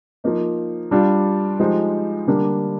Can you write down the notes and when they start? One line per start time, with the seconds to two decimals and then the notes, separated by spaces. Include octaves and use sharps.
0.24 F3 A#3 D#4
0.91 G3 D4 F4
1.60 F3 G#3 D#4 G4 C5
2.27 D3 G3 A#3 D4